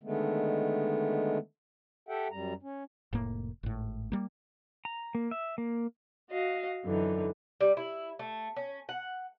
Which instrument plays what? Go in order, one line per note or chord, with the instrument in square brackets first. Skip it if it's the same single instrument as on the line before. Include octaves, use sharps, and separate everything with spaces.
[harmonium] D3 D#3 G#3 A3 B3
G4 A4 E5 F#5 G5
F#2 G3 A#5
C#4
[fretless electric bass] F1 A2 A#3
G#1 A2
G3 A#3
[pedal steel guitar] A#5
A#3
E5
A#3
[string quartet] F#4 D#5 F5
F#2 D3 E3 D#4
[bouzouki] G3
E4
A3
C#4
F#5